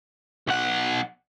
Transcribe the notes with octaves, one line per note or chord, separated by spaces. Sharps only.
B1 F#5